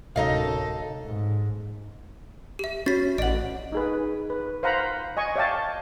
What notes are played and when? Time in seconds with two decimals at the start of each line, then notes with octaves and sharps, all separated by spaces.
0.16 D1 F#2 C3 G#3 D#4 A4 D#5 F5
1.05 G#2
2.59 G4 E5
2.86 C#4 F#4 A6 B6
3.18 A1 D5 D#5 F#5 F#7
3.72 D#4 G#4 B4
4.30 B4
4.63 C5 F5 F#5 A#5 B5
5.17 D#5 G#5 C#6
5.36 C#5 D5 E5 F5 G5 A5